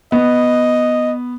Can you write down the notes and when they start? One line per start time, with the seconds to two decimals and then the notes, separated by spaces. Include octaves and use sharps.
0.12 B3 D#5